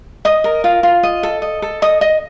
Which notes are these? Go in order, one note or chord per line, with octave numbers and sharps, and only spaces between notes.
D#5 D#6
A#4
F4
F4
D#5
A4
D#5
A4
D#5 D#6
D#5